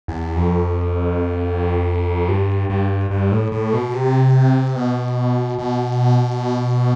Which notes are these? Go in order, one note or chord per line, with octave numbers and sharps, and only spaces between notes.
E2
F2
G2
G2
G2
A2
A2
B2
C3
B2
B2